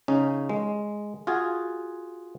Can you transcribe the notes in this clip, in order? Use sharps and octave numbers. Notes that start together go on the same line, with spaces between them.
C#3 C#4 D#4
G#3
F4 F#4 G#4